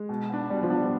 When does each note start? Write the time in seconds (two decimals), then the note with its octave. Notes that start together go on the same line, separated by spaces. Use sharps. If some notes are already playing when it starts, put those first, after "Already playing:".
Already playing: G#3
0.09 B2
0.30 B3 D4
0.50 B2 G3
0.63 F3
0.70 B3 D4
0.76 G3